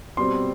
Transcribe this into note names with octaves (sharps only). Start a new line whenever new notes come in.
B2 G3 C4 C6